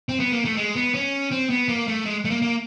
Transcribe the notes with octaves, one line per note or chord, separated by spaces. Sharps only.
C4
B3
A#3
A3
G#3
B3
C#4
C4
B3
A#3
A3
G#3
A3
A#3
A#3